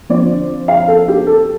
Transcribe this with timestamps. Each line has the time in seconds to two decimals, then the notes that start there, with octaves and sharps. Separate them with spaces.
0.09 D3 F3 C4 F4 D5
0.68 F5
0.88 A4
1.08 G4
1.27 A4